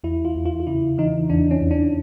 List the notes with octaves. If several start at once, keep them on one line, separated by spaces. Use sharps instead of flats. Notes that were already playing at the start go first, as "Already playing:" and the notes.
E2 E4
F4
E2
F4
F4
C#3 E4
E3 D#4
E2 D4
C#4
E2
D4